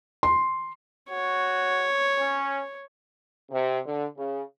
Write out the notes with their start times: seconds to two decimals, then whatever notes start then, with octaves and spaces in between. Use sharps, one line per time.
0.23 C6
1.10 F#4 C#5
2.19 C#4
3.51 C3
3.85 D3
4.16 C#3